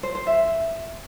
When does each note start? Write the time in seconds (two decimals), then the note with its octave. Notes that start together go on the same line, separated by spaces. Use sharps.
0.03 C5
0.15 C5
0.27 E5